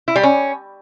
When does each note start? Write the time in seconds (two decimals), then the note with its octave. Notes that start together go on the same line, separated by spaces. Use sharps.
0.08 E4
0.16 G3
0.23 C#4